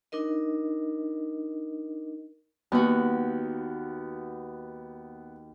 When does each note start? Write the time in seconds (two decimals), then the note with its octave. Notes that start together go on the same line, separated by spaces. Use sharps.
0.12 D4 D#4 A#4 D#5
2.72 D#2 B3 F#4